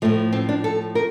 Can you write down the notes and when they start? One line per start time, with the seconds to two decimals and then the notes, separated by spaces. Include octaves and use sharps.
0.02 A2 F3 A3
0.33 C4
0.49 D4
0.64 A4
0.95 A#4